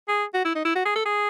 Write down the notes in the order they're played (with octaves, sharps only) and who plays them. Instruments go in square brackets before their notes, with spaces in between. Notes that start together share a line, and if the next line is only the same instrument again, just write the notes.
[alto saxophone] G#4
F#4
E4
D#4
E4
F#4
G#4
A4
G#4